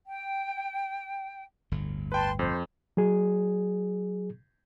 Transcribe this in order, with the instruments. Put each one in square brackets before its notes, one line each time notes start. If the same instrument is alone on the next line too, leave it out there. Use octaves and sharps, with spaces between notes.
[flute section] G5
[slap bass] G1 D2 A2
[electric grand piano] B4 G5 [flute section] A5 C6
[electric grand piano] F2 [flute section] C5
[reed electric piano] F#3 G#4